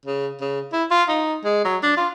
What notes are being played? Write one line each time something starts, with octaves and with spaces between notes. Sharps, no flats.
C#3
C#3
E4
F4
D#4
G#3
F#3
D4
F4